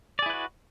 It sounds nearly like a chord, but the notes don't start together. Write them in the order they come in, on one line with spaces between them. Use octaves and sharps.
D5 G#4 E4 B4 F#4